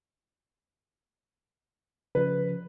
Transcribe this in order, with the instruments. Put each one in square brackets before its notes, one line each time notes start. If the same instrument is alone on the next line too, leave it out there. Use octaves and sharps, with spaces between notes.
[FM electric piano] C#3 F3 [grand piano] B4